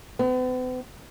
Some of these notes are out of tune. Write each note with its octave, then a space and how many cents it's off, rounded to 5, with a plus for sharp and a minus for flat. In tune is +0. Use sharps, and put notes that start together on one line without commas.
B3 +45